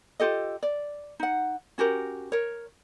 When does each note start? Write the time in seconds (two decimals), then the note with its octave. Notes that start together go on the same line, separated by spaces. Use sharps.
0.20 F4 G4 A4 D#5
0.63 D5
1.20 D#4 F#5
1.78 C#4 F#4 G4 A#4
2.32 A#4 C#5